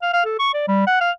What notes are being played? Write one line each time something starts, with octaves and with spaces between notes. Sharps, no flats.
F5
F5
A4
C#6
D5
G3
F#5
F5